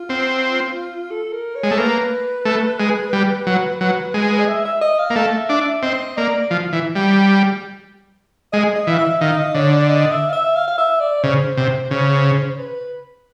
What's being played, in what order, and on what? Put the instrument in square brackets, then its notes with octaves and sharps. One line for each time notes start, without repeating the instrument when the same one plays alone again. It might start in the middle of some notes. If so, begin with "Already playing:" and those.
Already playing: [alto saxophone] F4
[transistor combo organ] C4
[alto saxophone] A4
A#4
C#5
[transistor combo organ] G#3
A3
[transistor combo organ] A#3 [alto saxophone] B4
[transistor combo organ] A3
G#3
G3
F#3
F#3
G#3
[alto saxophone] D#5
E5
E5
D#5
F5
[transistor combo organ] A#3
[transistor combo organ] A3 [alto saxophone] F5
[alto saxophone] E5
[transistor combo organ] D4
[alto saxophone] E5
[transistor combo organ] C4 [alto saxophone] D#5
[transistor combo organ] A#3 [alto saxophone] D5
[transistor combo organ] F3
E3
G3
[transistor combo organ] G#3 [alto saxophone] D#5
[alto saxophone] D#5
[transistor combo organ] E3 [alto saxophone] F5
[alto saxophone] E5
[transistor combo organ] D#3 [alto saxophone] F5
[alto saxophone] D#5
[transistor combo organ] D3 [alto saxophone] C#5
[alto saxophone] D5
D#5
E5
F5
E5
F5
F5
E5
D5
[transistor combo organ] C#3 [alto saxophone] C5
[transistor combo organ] C3
C#3
[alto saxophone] B4